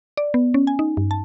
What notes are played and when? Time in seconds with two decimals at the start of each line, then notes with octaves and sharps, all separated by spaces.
0.17 D5
0.34 B3
0.54 C#4
0.67 G#5
0.79 D#4
0.97 G2
1.11 A5